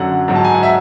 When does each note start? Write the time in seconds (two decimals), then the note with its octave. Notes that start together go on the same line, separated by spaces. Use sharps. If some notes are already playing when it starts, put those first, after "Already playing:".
Already playing: F#2 D3 F#3 F#5
0.28 G#2 F#3
0.35 A5
0.44 G#5
0.54 F#5
0.63 E5